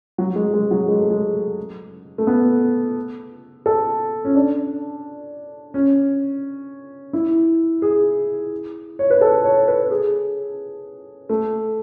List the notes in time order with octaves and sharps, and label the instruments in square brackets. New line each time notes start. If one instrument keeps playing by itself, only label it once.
[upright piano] F#3
G#3
G#3
F#3
G#3
A3
G#3
A3
B3
A4
C#4
D4
C#4
E4
G#4
C#5
B4
A4
C#5
B4
G#4
A3